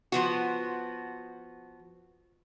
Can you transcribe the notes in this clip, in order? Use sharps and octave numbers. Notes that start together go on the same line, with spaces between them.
F3 B3 F#4